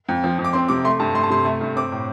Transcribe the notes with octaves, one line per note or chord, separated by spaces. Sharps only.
F2
F3
F2
D6
C4 C6
C3 D6
A3 C6
G2 A5
A3 C6
A5
C3 C6
A3
G2
C4 D6
A2